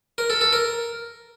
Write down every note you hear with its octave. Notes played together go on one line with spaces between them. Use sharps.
A#4
A4
A4
A#4